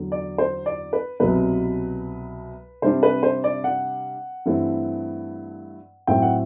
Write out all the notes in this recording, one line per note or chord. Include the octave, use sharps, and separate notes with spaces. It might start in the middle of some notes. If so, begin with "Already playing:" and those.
Already playing: E2 D3 F#3
D5
C5
D5
B4
C2 B2 F#3 B4
C3 G3 D4 C5
B4
C5
D5
F#5
G2 E3 A3 C4
A2 F#3 C4 E4 G5
F#5